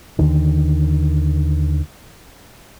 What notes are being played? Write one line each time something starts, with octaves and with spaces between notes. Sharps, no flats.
D#2 D3 D#3